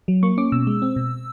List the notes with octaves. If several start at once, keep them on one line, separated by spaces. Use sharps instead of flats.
F#3
A#3 C#6
C#4 D6
B2 E6
G#3
C4
B2